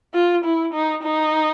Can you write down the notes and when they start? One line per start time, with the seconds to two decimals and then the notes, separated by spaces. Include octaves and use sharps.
0.14 F4
0.44 E4
0.73 D#4
1.03 D#4